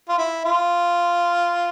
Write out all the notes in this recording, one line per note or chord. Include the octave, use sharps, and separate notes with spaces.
F4
E4
F4